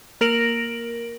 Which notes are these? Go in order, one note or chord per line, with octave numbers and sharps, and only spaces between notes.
A#3 A#4 A#6 D7 F#7